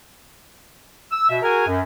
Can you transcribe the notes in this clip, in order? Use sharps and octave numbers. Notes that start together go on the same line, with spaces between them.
E6
B2 E5
F#4 G#4 A#4 G#5
F#2